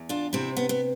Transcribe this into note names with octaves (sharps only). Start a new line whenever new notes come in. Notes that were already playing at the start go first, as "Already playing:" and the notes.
Already playing: E2
D4 F4
C3 C4 E4
B3
B3